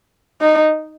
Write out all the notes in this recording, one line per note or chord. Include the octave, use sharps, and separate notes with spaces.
D#4